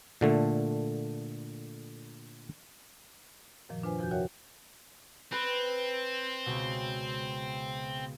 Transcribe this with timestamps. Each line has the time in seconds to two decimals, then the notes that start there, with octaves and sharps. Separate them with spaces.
0.21 A#2 D3 A3
3.69 F#2 A#2 D#3 F3
3.83 D4 F4 B4 C5 G#5
3.99 E2 C3 F3 F#4 G#5 G6
4.11 F#4 A#4 C#5 E5 F#5 G5
5.32 C4 B4
6.46 C#2 B2